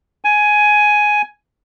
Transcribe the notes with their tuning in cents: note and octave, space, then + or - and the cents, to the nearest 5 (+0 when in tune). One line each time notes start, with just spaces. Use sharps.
G#5 +10